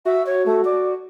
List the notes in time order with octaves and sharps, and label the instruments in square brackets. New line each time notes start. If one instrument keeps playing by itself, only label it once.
[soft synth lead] F#4 [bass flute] E5
[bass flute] C#5
A3
D5